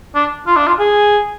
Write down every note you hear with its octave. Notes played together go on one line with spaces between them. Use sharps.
D4
F4
D4
F4
G#4